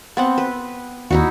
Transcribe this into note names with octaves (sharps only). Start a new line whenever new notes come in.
B3 C4 F#5
B4
D#2 D#4 E4 F#4